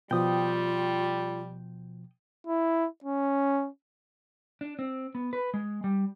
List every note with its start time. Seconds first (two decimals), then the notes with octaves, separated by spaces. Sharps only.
0.11 B2 F3 G3 F4 G5 D#6
2.47 E4
3.04 C#4
4.61 D4
4.79 C4
5.15 B3
5.33 B4
5.54 G#3
5.84 G3